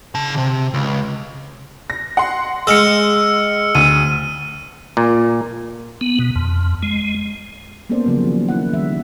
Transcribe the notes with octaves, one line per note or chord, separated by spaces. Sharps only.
C#3 A5
C3
C#2
A#6
F#5 C6
G#3 E6 F6 C#7
D2 D#7
A#2
B3
B2
F2
G#3
A#3 B3 C#4 A4 C5 D5
C#3 F3 F#3 A#3
D#3 F#3
E4 F#5
D#3 G3 E5